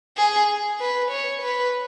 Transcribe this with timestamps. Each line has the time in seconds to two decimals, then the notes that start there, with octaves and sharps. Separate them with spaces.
0.17 G#4
0.80 B4
1.11 C#5
1.42 B4